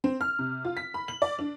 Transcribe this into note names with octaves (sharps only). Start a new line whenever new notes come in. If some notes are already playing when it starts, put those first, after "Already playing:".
C4
F6
C3
F4
B6
B5
F#7
D5
D4